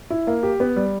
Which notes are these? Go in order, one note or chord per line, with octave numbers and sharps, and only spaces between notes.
E4
A#3
G4
B3
G3